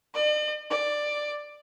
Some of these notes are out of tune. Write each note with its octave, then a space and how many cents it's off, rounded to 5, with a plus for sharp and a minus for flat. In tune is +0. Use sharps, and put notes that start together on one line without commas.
D5 +45
D5 +10